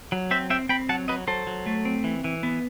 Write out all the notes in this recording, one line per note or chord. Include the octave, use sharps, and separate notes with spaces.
F#3
C4 C5 E5
C4 E5 G5
C4 G5 B5
F#3 F#5 A5
F#3 B4 D#5
F#3 A4 C5
F#3
A3
C4
E3
E3
B3